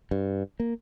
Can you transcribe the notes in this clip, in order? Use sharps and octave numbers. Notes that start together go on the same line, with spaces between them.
G2
A#3